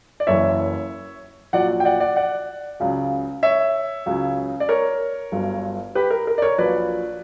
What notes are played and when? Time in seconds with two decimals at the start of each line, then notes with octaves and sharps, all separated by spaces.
0.20 D5
0.27 F#1 F#2 E3 C#5 E5
1.53 A#1 A#2 F#3 D5 F#5
1.80 G5
1.85 D5 F#5
2.00 D5 F#5
2.16 D5 F#5
2.80 C#2 C#3 F#3
3.43 C#5 E5
4.06 C#2 C#3 F#3
4.60 D5
4.69 A#4 C#5
5.32 G1 G2 F#3
5.95 G4 B4
6.10 A#4
6.27 A#4
6.38 D5
6.42 A#4 C#5
6.58 A#1 A#2 F#3 B4 D5